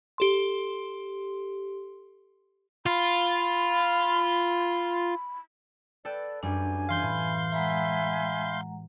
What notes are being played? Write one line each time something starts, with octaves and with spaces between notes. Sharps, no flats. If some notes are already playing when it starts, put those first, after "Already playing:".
G4 A4 C6
F4 B5
A4 B4 D5 G5
F#2 G3 D4 G#5
E3 F5 C6 G6
A2 B5
G#3 E5 F#5 G#5 A#5 B5